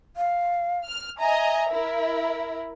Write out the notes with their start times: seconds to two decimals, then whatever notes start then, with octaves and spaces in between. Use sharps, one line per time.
0.17 F5
0.87 F6
1.19 D#5 E5 G#5 A#5
1.71 E4 A#4